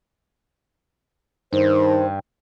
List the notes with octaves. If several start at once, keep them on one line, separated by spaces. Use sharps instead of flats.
G2 D#3 C5